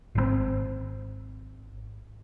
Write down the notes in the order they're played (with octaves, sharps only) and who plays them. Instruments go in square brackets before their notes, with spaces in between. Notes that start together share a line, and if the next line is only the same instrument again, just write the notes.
[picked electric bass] G#1 C#3 C4